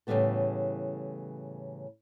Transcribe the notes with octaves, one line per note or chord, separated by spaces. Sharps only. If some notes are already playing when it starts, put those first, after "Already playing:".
A2 C#3 E3 G3 B3 A4